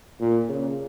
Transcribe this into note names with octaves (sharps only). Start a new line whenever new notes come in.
A#2
C#3